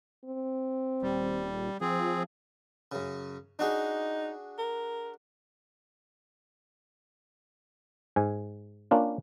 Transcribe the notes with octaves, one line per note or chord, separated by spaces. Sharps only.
C4
D#1 G3
F3 C4 G#4
F#2 C#3
D4 D#4 F#4 G#4
A#4
G#2 G#5
A#3 C#4 D4 F4